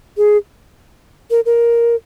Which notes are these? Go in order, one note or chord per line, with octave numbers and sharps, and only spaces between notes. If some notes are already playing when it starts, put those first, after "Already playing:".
G#4
A#4
A#4